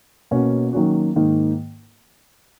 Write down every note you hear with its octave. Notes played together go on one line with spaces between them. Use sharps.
B2 A#3 C#4 F#4
D#3 F#3 A#3 C#4 F#4
G#2 D#3 A#3